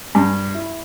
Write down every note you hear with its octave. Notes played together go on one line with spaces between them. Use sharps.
G2
E4